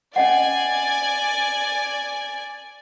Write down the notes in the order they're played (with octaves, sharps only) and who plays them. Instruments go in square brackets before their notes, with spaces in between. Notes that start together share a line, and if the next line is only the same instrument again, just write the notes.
[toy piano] C#4 D#5 F#5 [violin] D5 G#5